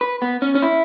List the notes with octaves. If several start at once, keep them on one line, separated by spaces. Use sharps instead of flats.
B4
B3
C#4
C#4
E4